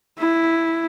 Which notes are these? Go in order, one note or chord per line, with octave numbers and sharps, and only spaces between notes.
E4